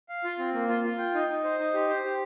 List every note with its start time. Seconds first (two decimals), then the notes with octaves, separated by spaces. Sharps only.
0.09 F5
0.24 F4
0.39 C4
0.54 A#3
0.69 F4
0.84 F4
0.99 G5
1.14 D#4
1.29 D#4
1.44 C5
1.59 D#4
1.74 G4
1.89 C5
2.04 G4